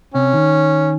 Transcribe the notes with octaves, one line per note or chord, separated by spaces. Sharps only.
C3 C#4
D#3